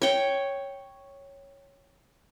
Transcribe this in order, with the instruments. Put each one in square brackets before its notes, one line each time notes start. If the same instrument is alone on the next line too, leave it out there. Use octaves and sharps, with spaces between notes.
[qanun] C#5 G5